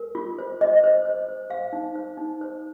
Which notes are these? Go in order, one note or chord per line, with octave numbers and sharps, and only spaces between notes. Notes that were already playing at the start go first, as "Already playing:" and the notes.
Already playing: A#4
F4
C5
C5 D#5
C5
C5
C5
C5 F5
D#4
C5
D#4
C5